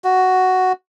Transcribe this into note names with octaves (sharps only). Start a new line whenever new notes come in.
F#4